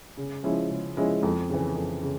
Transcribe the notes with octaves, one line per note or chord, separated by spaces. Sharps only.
C#3
F3 G#3 C#4 E4
C#3
F3 G#3 C#4 E4
F2
C#3 E3
F2
C#3